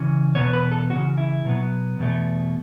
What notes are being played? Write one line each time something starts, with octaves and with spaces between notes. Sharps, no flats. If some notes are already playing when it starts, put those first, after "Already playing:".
Already playing: C#3 E3 C#4
E2 B2 B3 C#5
B4
A4
C#3 E3 C#4 F#4
E4
B2 F#3 B3
E2 B2 A3